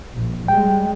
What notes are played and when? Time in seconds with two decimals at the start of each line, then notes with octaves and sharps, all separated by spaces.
0.13 A#1
0.48 G3 G#3 G5